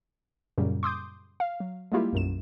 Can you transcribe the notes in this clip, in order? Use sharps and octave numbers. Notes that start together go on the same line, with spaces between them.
F#2 A#2 C#3 G3
C6 D6 D#6 G6
F5
F#3
G3 G#3 A#3 E4 F4 G4
B1 F#2 E7